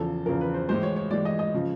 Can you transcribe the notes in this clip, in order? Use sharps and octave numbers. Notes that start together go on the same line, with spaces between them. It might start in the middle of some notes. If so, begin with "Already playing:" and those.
Already playing: E2 C#3 F3 A4
E2 C#3 F3 A#4
B4
C5
A2 E3 G#3 C5
C#5
C#5
A2 E3 G#3 D5
D#5
D#5
C#3 F3